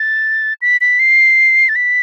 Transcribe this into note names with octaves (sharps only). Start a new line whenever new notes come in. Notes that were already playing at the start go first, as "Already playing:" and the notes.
Already playing: A6
B6
B6
C7
A6
B6